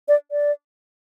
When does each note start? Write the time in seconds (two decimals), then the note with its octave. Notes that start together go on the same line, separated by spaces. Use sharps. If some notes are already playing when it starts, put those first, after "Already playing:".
0.08 D5
0.31 D5